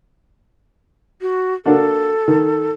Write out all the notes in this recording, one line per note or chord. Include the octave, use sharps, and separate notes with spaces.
F#4
A#3 D4 F#4 A4
D#3